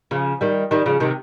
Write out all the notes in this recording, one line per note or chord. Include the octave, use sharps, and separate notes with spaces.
C#3 F3
D#3 G3
D#3 G3
C#3 F3
C3 D#3